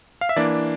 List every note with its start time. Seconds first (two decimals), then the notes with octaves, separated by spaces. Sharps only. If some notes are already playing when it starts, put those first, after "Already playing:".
0.21 F5
0.29 E5
0.36 E3 A#3 D4 D5